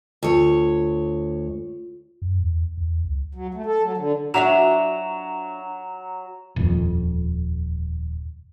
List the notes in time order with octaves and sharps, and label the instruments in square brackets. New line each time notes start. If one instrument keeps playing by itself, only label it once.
[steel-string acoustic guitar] D2 C#5 [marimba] F4
[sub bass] F#2
E2
E2
C#2
[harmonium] F#3
A3
A4
F#3
D3
[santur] F#3 [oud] D4 E4 F#4 [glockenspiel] A#5 E7 F7
[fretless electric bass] D#1 F2